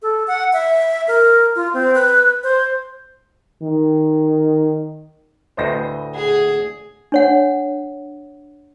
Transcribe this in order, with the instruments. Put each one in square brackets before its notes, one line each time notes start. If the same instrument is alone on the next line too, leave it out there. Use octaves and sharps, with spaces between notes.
[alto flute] A4
F#5
E5
A#4
F4
C4
B4
C5
[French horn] D#3
[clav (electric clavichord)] D2 A2 C5 [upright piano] B4 D#5 A#6
[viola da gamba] G#4 [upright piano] F#5
[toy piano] D4 C#5 F#5